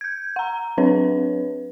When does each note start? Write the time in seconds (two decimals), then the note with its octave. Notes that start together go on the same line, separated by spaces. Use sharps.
0.01 G6 G#6
0.36 F#5 A#5
0.78 F#3 C4 D4 B4 C#5